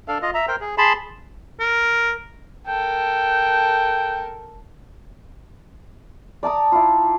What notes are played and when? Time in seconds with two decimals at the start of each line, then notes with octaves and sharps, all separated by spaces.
0.08 D4 A4 F5
0.22 F4 D#5
0.34 E5 A#5
0.48 A#4 C5 G5
0.61 G#4
0.78 G#4 A5 B5 C6
1.60 A#4
2.67 A4 A#4 G5
6.43 D5 A5 A#5 D#6
6.72 E4 F4